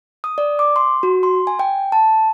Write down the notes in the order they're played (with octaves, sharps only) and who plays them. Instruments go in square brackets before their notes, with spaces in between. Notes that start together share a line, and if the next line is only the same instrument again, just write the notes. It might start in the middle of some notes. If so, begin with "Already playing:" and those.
[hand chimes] D#6
D5
D6
C6
F#4
C6
G#5
G5
A5